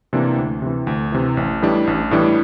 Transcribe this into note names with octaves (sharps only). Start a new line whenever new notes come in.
C3 E3 A#3 D4
D2
C3 E3
D2
C3 E3
A1
A2 E3 G3 D4
A1
A2 E3 G3 D4